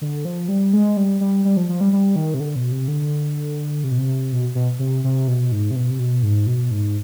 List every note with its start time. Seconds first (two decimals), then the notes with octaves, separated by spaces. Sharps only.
0.01 D3
0.25 F3
0.48 G3
0.73 G#3
0.97 G3
1.21 G3
1.45 G3
1.57 F3
1.69 F3
1.81 G3
1.93 G3
2.16 D#3
2.34 C3
2.40 D3
2.56 B2
2.72 C3
2.88 D3
3.84 C3
3.91 B2
3.98 C3
4.32 B2
4.55 B2
4.79 C3
5.04 C3
5.28 B2
5.52 G#2
5.71 C3
5.76 B2
5.90 C3
5.99 B2
6.23 G#2
6.47 B2
6.71 G#2